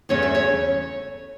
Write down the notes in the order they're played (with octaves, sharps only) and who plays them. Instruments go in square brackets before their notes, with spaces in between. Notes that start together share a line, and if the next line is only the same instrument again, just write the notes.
[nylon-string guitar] E2 C#3 A3 C#4 C#5
E5
C#5